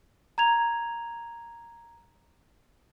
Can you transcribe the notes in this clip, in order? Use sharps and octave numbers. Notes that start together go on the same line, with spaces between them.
A#5 G#6 F7